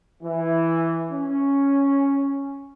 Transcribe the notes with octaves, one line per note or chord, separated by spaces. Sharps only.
E3
C#4